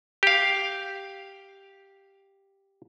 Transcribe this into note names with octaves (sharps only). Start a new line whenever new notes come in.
G4 F5